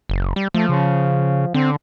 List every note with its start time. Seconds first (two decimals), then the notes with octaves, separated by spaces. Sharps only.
0.10 F#1
0.36 G3
0.54 F3 A3
0.69 C#3
1.54 D3 C4